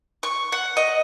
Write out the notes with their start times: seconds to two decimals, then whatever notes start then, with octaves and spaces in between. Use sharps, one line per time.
0.23 C#6
0.52 F#5
0.77 D#5